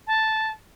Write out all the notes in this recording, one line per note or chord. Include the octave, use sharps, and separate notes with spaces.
A5